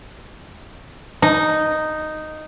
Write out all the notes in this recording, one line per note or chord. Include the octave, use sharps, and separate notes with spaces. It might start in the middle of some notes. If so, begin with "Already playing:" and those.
D#4